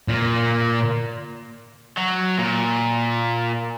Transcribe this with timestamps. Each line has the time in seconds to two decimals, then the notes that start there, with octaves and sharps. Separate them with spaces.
0.08 A#2
1.98 F#3
2.38 A#2